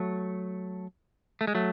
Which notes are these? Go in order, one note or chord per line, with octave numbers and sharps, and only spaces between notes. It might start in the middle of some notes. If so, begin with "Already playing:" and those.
Already playing: F#3 A3
A3
G#3
F#3 A3